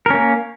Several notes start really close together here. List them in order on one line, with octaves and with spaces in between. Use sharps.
A#4 C#4 A#3